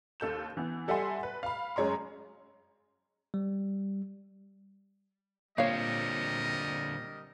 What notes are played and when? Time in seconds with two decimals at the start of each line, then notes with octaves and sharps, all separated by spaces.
0.20 D#2 A4 G6 E7
0.57 E3 B3
0.88 G3 A4 E5 F#5 G#5 C6
1.23 B4
1.43 F5 B5
1.76 F#2 G#3 C#5 A#5 C6
3.34 G3
5.58 A#2 D3 G3 C4 A#4 C#5 D#5 F5